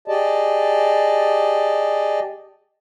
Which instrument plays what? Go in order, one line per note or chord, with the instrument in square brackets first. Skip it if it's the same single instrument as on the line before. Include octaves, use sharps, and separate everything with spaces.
[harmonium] G4 G#4 D5 D#5 A5